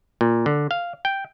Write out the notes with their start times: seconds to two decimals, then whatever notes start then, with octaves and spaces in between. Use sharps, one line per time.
0.21 A#2
0.46 D3
0.71 F5
1.05 G5